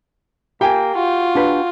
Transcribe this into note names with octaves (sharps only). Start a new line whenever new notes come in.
A#3 G4 G5 G#5
F4 F#4
D4 G4 B4